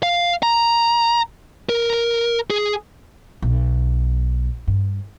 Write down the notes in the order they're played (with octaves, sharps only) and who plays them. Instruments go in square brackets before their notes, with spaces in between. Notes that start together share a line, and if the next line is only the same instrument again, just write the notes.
[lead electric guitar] F5
A#5
A#4
G#4
[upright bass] B1
G2